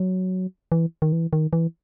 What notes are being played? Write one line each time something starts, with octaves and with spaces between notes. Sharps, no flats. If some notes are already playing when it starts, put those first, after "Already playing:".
Already playing: F#3
E3
D#3
E3
D#3
E3